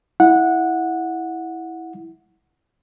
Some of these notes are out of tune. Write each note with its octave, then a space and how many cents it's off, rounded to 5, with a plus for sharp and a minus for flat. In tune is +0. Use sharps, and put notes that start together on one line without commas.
E4 -10 F#5 -15